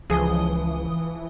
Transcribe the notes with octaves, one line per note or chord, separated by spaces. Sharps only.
C#2 E3 F3 G#4 D#6 G7